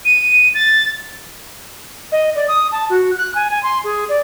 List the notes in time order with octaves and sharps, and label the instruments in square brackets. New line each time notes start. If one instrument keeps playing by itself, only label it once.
[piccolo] D#7
A6
[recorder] D#5
D5
D#6
A5
F#4
F#6
G#5
G#5
C6
G#4
D5